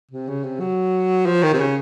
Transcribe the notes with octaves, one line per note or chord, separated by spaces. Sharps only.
C3
C#3
C3
F#3
F3
D#3
C3
C#3